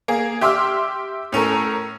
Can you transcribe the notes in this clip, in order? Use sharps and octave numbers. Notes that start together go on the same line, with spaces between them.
A#3 G#4
G4 E5 C6 D6 E6 F6
A2 C#4 A4 A#4